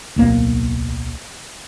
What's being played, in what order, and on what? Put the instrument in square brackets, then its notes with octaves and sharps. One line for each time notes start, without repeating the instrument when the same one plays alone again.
[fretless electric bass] D1 B1 A#3